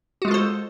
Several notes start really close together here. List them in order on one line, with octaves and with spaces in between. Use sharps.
F#4 G#3 F4 A4 C5